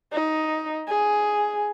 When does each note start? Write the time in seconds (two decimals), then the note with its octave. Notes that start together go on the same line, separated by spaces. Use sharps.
0.12 D#4
0.88 G#4